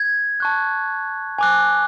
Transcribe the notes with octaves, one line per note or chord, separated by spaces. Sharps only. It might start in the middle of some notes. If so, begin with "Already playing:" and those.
Already playing: G#6
A5 C#6 F#6
G#5 D6 F#6